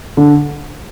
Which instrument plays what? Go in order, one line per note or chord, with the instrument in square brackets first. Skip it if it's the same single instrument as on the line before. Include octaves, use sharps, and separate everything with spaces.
[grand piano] D3